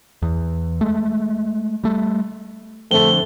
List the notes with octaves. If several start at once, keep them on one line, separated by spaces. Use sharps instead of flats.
E2
G#3 A3
G3 A3
F2 D3 A3 G7